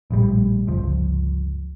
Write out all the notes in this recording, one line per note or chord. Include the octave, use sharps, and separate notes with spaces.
A#1 A2 G3
G1 C#2 F3